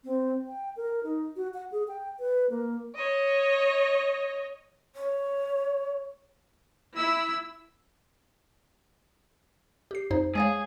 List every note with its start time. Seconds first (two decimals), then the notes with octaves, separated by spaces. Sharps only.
0.04 C4
0.48 G5
0.76 A#4
1.04 D#4
1.36 F#4
1.54 F#5
1.72 G#4
1.88 G5
2.20 B4
2.50 A#3
2.95 C#5 D#5
4.94 C#5
6.96 E4 E6
9.91 G4 C7
10.11 F2 D#4 C5
10.35 G#3 G#4 C#5 F5